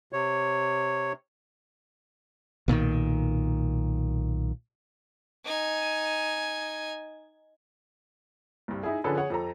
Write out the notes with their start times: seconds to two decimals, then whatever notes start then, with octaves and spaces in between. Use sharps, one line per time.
0.13 C3 C#5
2.68 B1 A#2 D3 D#3
5.45 D#4 G#5
8.68 C2 G2
8.83 D#4 E4 G#4
9.04 D3 F3 C#4 G#4 A4 B4
9.17 G#4 C#5 F#5
9.30 F2 A4 A#5